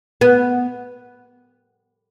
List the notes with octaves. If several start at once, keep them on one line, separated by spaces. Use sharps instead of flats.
B3